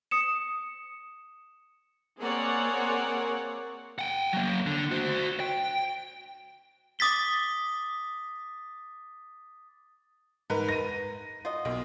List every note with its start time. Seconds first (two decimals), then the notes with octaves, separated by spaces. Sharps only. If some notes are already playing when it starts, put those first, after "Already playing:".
0.11 D#6 C#7 E7
2.20 A#3 C4 G#4 C#5 D5 F#5
3.99 F#5 G5
4.33 F#3 A#3
4.67 D3
4.92 F#4 C5
5.40 G5
6.99 D6 D#6 A6 B6 G7
10.50 G#2 A#4 B4
10.69 A#6 D#7
11.45 F4 F#4 D#5
11.65 B1 A#3